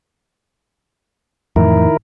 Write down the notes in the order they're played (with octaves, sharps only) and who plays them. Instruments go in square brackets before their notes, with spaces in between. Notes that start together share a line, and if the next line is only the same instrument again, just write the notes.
[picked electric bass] F2 A2 E3 [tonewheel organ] D#3 E4 A#4